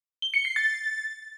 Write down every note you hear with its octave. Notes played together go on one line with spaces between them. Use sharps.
G7
C#7
C7
A6